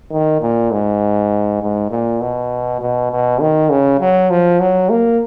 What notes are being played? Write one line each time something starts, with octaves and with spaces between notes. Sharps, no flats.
D#3
A#2
G#2
G#2
A#2
B2
B2
B2
D#3
C#3
F#3
F3
F#3
A#3